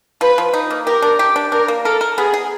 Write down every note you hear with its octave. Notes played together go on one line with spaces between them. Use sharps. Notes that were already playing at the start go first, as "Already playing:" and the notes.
F3 B4
F3
D#4
A#3
G4 A#4
D4
G4
D4
D4 A#4
A#3
A4 A#4
A#4
B3 G#4
G#4